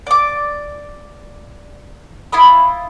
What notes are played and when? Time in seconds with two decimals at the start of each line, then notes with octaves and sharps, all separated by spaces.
0.07 D5 D6
2.32 E4 F4 B5 D#6